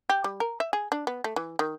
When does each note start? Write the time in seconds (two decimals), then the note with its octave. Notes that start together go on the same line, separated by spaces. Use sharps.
0.09 G4
0.24 G3
0.40 A#4
0.60 E5
0.73 G#4
0.92 D4
1.07 B3
1.24 A3
1.36 E3
1.59 D#3